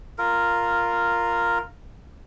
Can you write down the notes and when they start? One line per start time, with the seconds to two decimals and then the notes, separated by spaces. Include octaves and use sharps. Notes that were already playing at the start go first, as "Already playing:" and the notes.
0.18 F4 A#4